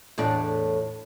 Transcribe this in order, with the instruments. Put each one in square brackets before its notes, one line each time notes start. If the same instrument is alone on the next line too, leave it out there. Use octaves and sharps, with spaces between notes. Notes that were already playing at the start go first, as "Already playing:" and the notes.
[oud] E2 A2 D4